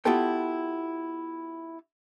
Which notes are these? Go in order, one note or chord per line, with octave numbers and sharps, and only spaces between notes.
B3 E4 F4 G4 A4 G5